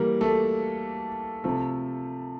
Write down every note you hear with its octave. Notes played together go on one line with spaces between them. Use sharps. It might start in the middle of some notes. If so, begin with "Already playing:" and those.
Already playing: E3 G3 A#3 A#4
A3 A4
C3 F3 A3 A4